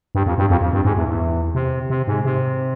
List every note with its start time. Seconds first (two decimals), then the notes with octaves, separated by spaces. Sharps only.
0.15 G2
0.26 F2
0.38 G2
0.50 F2
0.61 F2
0.73 G2
0.85 G#2
0.97 E2
1.08 E2
1.55 C3
1.90 C3
2.07 G#2
2.25 C3